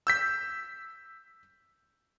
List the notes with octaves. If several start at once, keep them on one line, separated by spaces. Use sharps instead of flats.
E6 G6 B6